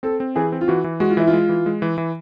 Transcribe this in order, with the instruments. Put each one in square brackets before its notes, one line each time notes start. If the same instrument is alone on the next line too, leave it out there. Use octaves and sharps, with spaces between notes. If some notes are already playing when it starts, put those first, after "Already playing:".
[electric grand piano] C4 [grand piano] A4
[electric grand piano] C4
[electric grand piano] E3 [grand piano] G#4
[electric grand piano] C4
[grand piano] F4
[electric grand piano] E3 [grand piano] F#4
[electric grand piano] E3
[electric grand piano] G#3 [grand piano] F#4
[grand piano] F4
[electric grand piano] E3 [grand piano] E4
[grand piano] F4
[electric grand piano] G#3
E3
G#3
E3
E3